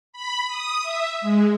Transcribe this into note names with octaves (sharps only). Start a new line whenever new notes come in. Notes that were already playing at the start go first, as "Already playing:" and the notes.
B5
D#6
E5
G#3